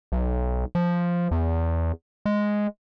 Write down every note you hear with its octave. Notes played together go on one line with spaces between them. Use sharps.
B1
F3
E2
G#3